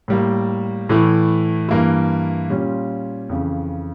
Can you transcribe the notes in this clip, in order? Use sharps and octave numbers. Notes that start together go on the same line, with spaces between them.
A2 G3 A#3
A2 E3 A3 E4
G2 E3 A#3 E4
A#2 G3 C#4 F4
F2 C#3 E3